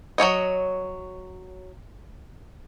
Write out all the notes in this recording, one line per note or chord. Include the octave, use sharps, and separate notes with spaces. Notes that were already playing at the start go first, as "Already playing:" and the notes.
F#3 C#4 C#5 D#5